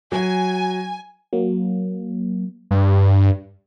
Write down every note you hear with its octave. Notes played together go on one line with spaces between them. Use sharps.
F#3 G#5
F#3 A#3
G2